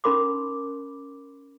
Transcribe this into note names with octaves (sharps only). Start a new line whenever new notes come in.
C#4 D#4 A#4 B5 C6 D6